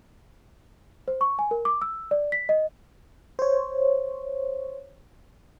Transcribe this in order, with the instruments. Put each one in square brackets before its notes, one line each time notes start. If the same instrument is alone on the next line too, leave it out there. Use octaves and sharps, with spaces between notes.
[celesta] C5
C#6
G#5
A#4
D6
E6
D5
B6
D#5
[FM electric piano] C5 C#5